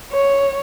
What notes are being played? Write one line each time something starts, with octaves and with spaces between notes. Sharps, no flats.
C#5